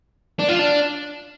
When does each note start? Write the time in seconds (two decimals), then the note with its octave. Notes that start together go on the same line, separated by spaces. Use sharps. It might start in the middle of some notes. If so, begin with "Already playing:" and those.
0.39 D4
0.49 F4
0.59 D4